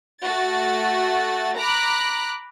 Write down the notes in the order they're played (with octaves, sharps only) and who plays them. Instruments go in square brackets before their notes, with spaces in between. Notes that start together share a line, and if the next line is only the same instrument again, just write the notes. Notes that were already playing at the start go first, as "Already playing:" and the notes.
[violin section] A3 F#4 A6
A#5 B5 D6 F#6